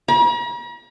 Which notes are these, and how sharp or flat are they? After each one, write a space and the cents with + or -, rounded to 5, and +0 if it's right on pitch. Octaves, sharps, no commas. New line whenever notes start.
A#5 +45